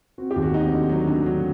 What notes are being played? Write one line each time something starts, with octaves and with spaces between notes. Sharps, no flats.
C4 F#4
G4
D#2
F#4
C4 D#4
D3
F#3
D3
F#3